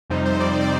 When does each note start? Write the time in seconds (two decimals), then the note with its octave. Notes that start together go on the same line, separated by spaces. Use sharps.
0.10 F2 C3 G3 C4 D#4
0.26 C5
0.40 D5
0.61 D5